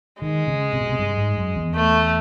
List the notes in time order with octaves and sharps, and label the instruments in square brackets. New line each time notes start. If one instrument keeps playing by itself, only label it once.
[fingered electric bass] D#3 [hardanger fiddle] G#3
[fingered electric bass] C#3
C3
B2
C3
G2
G#2
F#2
E2
[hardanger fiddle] A3